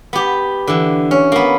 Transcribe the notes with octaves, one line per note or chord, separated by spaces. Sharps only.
B3 G4
D3 E3
C#4
A#3 B3